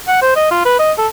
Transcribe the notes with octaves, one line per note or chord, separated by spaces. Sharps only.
F#5
C5
D#5
F4
B4
D#5
A4